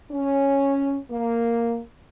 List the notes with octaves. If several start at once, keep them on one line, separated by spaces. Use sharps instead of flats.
C#4
A#3